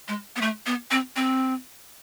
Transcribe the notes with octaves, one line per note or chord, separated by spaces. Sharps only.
G#3
B3
A3
B3
C4
C4